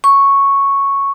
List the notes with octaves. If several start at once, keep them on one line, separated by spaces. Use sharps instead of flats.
C#6